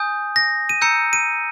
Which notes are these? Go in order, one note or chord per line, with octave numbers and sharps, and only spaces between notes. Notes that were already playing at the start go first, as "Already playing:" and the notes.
Already playing: G#5 D#6 G6
A#6
D#7
A#5 E6 G6 C#7
D#7